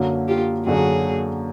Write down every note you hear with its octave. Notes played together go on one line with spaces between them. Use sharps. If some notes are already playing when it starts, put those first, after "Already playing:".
Already playing: F#2 D3 F#3 A#3
F4 G4
F#2 D3 F#3 A#3 F#4 G#4